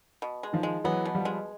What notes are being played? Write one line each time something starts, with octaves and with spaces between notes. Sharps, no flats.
B2
G#3
D#3 F3
G#3
E3 F#3 B3
B2
F3 G3
G#3